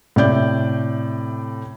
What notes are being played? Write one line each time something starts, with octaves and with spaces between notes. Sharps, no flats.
A2 C3 D5 G6